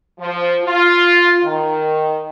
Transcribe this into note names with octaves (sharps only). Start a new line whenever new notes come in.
F3
F4
D#3